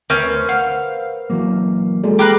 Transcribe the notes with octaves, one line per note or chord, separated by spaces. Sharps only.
D2 C4 C#4 A#4 B4
C5 F5 F#5
E3 F#3 A#3
G#3 A#3 F#4 G#4 A4 D5
G4 A#4 B4 A#5 C7